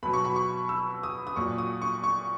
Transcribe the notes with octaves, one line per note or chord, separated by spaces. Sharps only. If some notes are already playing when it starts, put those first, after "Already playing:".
B2 F#3 B5
C#6
B5
C#6
E6
D#6
D#6
A#2 F#3 C#6
D#6
C#6
C#6